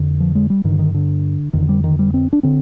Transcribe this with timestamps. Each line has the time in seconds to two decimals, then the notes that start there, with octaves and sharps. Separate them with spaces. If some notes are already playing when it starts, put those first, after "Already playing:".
Already playing: F2 D3
0.20 F3
0.35 G#3
0.50 G3
0.64 G2 D3 D#3
0.79 D#3
0.94 D3
1.53 F2 D3 D#3
1.69 G3
1.84 D#3
1.99 G3
2.14 C4
2.33 D4
2.43 D3 C4